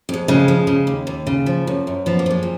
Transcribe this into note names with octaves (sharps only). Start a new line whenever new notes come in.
F2 G#3
C#3 G#3
F3
C#3
D#2
D#2
C#3
F3
F#2
F#2
F3 B3
A#3
F3 G#3
A#2